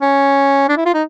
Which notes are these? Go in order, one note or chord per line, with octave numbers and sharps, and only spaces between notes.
C#4
D4
E4
F4
D#4